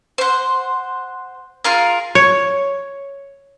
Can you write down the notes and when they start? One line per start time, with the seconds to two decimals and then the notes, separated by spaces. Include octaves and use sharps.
0.18 C5 F#5
1.64 F4 G#4 A#4 F5
2.15 C#5